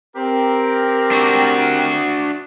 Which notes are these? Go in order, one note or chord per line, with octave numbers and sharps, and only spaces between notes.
C4 G4 A#4
D4 F#4